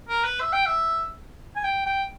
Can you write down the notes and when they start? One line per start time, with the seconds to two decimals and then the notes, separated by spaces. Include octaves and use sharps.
0.08 A#4
0.24 B4
0.40 E5
0.53 G5
0.66 E5
1.56 G#5
1.64 G5
1.86 G5